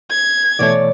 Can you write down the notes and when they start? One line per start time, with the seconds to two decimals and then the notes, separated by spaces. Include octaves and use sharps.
0.11 G#6
0.59 B2 E3 A3 C#5 D5